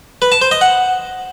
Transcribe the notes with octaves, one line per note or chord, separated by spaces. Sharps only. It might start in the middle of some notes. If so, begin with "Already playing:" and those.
B4
A5
C5
D#5
F#5